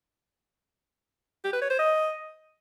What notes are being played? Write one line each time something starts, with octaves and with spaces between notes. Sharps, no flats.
G4
B4
C#5
C5
D#5